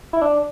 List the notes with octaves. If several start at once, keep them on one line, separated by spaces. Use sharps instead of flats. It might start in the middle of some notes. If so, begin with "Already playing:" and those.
E4
D4